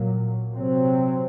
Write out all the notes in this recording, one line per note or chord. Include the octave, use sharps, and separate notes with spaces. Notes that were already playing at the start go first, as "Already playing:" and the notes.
Already playing: A#2 F#3 A#3
C3 F#3 C4